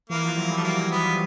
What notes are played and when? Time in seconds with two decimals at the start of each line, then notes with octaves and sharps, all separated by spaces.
0.10 E3 A#3
0.24 F3
0.36 F#3
0.50 G3
0.57 A3
0.63 F#3 A#3
0.77 F3
0.91 F#3 B3
1.05 G3